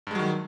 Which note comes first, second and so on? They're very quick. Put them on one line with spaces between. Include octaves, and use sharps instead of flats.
G2 G#3 F#3 D#3